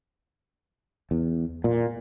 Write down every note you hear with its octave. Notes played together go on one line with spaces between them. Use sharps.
E2
A#2